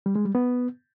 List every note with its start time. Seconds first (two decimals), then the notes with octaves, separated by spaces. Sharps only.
0.06 G3
0.16 G#3
0.25 G3
0.35 B3